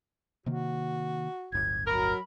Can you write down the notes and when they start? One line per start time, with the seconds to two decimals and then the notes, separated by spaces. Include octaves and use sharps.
0.46 C3 D#3 A#3 F#4
1.52 D1 G1 G#6
1.87 F#3 A#4 B5